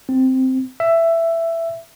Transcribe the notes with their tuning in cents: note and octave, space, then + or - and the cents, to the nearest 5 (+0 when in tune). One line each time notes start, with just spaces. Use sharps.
C4 -5
E5 +10